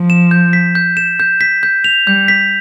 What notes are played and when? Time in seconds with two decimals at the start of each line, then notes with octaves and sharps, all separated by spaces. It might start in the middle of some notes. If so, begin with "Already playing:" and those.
Already playing: F3
0.10 E7
0.31 G6
0.53 B6
0.75 G6
0.97 E7
1.20 G6
1.41 B6
1.63 G6
1.84 F7
2.07 G3 G6
2.28 B6